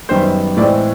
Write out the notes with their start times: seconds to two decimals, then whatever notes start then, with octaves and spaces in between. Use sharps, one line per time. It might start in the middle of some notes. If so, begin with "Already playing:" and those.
0.09 F#2 D#3 G3 B3 C5
0.57 A2 E3 G#3 C4 D5